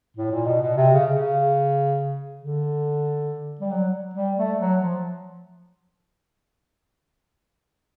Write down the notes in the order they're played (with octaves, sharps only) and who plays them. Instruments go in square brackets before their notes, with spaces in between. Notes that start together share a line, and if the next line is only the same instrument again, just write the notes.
[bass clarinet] A2
A#2
B2
B2
C3
C#3
C#3
D3
G3
F#3
G3
A3
F#3
F3